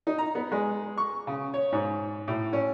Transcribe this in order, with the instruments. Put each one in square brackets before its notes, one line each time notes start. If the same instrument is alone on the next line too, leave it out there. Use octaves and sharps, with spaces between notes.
[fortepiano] D#4
A#5
B3
G#3
C#6
C#3
C#5
G#2
A2
C#4